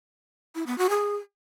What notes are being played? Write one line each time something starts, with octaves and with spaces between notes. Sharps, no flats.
E4
B3
F#4
G#4